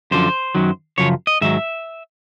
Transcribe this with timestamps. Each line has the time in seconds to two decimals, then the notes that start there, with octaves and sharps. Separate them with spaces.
0.11 F#2 D3 F3 C5
0.55 F#2 D#3 F#3
0.98 F#2 C#3 F3 C#5
1.27 D#5
1.41 G#2 D#3 F#3 E5